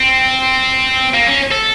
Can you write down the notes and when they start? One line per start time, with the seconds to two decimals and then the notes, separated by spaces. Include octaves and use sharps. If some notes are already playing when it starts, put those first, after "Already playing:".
Already playing: C4
1.14 A#3
1.27 C#4
1.51 A4